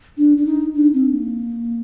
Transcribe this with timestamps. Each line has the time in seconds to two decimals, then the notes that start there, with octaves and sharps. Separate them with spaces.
0.17 D4
0.37 D4
0.46 D#4
0.75 D4
0.94 C4
1.12 A#3